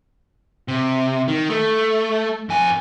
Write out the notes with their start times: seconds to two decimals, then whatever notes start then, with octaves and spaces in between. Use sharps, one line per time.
0.68 C3
1.28 D#3
1.50 A3
2.49 F2 G#5